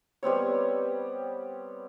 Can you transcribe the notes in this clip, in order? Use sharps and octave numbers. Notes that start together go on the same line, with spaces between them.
G3 B3 C4 C#5